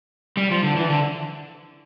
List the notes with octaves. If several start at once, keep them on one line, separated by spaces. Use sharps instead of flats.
G3
F3
D3
E3
D3